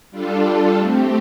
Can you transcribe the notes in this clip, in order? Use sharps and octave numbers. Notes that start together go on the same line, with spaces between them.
G3 D4 F4 A4
A3 C4 G4